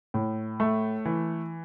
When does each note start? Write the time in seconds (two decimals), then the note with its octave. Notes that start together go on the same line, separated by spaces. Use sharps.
0.14 A2
0.60 A3
1.05 E3